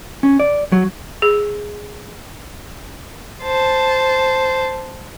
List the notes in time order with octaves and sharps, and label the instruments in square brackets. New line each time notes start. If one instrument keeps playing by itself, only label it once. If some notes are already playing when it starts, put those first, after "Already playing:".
[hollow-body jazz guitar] C#4
D5
F#3
[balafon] G#4
[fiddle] C5 A5